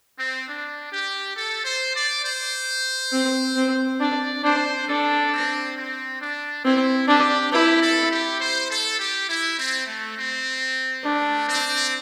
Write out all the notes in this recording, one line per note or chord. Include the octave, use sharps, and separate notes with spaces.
C4
D4
G4
A4
C5
D5
C5
C4
C4
D4 D5
D4 C5
D4 A4
C4
C4
D4
C4 E4
D4 G4
E4 G4
A4
G4
C5
A4
G4
E4
C4
A3
C4
A3 D4
C4